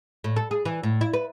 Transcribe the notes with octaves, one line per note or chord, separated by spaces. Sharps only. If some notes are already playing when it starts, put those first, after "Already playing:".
A2
A4
G#4
E3
A2
E4
B4